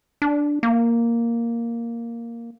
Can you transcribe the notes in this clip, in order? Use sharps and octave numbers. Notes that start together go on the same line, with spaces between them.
D4
A#3